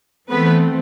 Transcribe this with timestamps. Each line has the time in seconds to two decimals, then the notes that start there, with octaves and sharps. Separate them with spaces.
0.31 E3 A3 B3 C4 B4